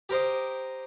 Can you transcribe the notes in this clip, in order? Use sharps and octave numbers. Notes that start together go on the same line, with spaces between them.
G4 A#4 C5 D#5